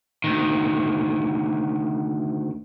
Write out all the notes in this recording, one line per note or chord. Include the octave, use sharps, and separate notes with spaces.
D2 D#3